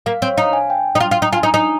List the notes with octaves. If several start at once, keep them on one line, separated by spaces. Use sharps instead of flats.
A#3 F5
C4 C#5
D#4 F5
G#5
G5
D#4
F4
F4
D#4
F4 G#5
D#4
D#4